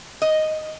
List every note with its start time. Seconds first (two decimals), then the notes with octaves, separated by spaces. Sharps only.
0.22 D#5